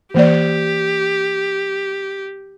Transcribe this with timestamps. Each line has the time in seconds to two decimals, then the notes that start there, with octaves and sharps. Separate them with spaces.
0.14 E3 A#3 G4 D5